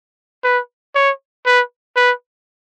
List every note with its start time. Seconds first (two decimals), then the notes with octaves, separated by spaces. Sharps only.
0.44 B4
0.95 C#5
1.46 B4
1.96 B4